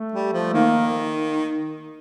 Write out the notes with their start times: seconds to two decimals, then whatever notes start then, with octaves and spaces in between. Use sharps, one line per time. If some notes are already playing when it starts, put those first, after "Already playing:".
Already playing: A3
0.12 G3
0.33 F3
0.53 D#3 A#3